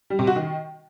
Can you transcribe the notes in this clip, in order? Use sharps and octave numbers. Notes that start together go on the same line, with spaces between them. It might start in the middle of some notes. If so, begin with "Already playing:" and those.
G3
C3
F#4
D#3